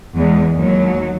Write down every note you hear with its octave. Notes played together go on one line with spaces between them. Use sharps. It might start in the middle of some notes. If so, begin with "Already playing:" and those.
E2 G#3
D#2 F#3